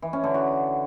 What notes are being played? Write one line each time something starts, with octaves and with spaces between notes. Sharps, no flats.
E3
C#4
D3
F#4